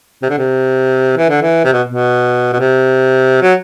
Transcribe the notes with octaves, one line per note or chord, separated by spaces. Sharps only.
C3
D3
C3
E3
D3
E3
C3
B2
B2
B2
C3
F#3